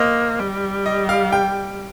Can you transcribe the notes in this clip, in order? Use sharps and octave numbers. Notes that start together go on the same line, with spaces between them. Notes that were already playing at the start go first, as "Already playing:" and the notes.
Already playing: A#3 C5 D#5
G3
D#5
F5
G5